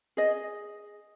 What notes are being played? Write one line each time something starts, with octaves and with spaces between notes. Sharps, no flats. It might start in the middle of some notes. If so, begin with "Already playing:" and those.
G#4 D#5